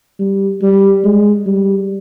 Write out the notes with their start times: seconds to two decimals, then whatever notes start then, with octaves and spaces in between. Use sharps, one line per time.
0.19 G3
0.62 G3
1.04 G#3
1.47 G3